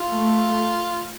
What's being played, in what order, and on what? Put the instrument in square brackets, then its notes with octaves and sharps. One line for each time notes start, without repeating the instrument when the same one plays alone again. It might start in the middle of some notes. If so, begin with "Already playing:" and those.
Already playing: [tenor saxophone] F4
[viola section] A3